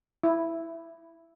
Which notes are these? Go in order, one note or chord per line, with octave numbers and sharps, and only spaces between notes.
E4